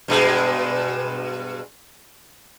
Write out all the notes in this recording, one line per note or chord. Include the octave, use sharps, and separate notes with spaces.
G2 B2 G#3